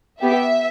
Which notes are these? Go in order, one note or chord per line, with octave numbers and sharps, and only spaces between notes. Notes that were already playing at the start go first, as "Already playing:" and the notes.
B3 G4 E5